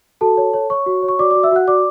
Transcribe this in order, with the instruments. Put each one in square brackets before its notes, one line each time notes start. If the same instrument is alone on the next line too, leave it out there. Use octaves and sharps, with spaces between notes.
[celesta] F#4 A4 A5
C#5
C#5
C#5 C#6
F#4
C#5
C#6
F#4 D5 D6
F#4 D5 D6
E5 E6
F#4 F#5 F#6
F#4 D5 D6